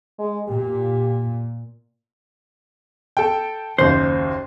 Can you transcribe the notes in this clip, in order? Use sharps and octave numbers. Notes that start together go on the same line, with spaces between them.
G#3
A#2 G4
A4 G5
F#1 D#2 C5